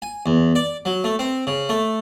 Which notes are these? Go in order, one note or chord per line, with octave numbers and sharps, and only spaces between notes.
G#5
E2
D5
F#3
A3
C4
C#3
A3